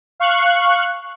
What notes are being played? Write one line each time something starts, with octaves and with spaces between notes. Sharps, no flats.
F5 C#6 F#6